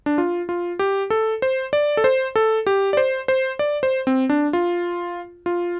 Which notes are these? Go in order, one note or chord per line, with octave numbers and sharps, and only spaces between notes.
D4
F4
F4
G4
A4
C5
D5
A4
C5
A4
G4
D5
C5
C5
D5
C5
C4
D4
F4
F4